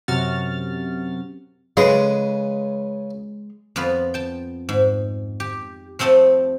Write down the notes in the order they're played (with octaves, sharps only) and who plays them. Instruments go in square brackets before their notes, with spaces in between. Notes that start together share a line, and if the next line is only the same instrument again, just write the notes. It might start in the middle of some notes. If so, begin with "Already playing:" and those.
[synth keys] F#2 C3 F#4 F6 A6
[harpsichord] C#3 B4 D#6 [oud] G#3
[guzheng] F2 B3 F4 B4
G5 A5
G#2
G4
F3 A3 C4 A4 D#5